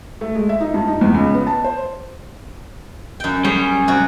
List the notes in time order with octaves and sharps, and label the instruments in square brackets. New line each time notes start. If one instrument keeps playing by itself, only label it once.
[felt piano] A3
G#3
E5
D#4
G2
D#4
E2
C#2
B3
A5
C5
[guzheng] F#2 G5
[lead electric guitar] G3 [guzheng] C#4 G#4
[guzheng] C3 F#4